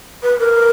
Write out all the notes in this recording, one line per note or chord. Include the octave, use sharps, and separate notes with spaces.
B4
A#4